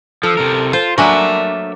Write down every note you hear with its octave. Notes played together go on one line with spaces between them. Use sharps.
F3 A4
C3 A#4
F4 C5
F#3 A3 A#3 D4 A#4 E5 G#5